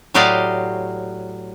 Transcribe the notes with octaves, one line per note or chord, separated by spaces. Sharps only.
A2 F#3 G4 D5 D#5 F5